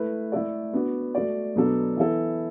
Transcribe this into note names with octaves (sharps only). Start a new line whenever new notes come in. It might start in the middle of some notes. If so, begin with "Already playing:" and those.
Already playing: A3 E4 B4
A3 E4 A4 D5
B3 D4 F#4
A3 F#4 D5
B2 F#3 B3 D4 A4
E3 B3 E4 A4